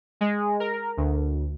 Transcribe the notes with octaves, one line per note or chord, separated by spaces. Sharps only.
G#3
A#4
D2